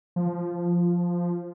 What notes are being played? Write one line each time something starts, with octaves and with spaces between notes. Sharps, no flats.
F3